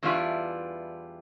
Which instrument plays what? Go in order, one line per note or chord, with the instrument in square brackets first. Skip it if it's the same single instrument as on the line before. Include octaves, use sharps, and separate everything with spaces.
[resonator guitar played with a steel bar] E2 E3 G3 D4 F4